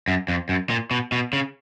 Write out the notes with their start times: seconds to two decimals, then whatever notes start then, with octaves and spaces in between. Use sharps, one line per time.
0.08 F#2
0.28 F2
0.49 F#2
0.70 A#2
0.91 B2
1.12 B2
1.33 C#3